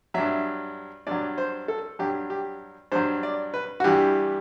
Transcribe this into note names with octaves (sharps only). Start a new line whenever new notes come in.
G2 F#3 E5
G2 F#3 D5
C5
A4
G2 F#3 G4
G4
G2 F#3 C5
D5
B4
F#4
G2 E3 G3 G4